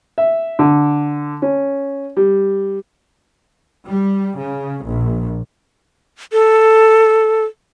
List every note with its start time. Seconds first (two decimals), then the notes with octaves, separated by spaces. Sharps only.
0.18 E5
0.59 D3
1.42 C#4
2.17 G3
3.87 G3
4.38 C#3
4.86 A#1
6.32 A4